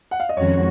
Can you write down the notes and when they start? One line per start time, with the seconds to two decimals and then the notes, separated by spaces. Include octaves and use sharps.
0.11 F#5
0.20 F5
0.29 D#5
0.37 F2 D#3 G#3 C#4 F#4 C#5